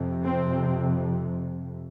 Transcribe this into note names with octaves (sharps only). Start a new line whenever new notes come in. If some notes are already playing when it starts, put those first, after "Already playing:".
Already playing: F2 C3
C4